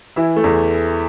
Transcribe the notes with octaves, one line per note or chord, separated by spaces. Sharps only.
E3 E4
A3
E2